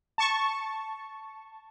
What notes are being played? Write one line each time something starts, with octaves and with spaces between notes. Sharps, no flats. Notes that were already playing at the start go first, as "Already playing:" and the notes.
A5 C#6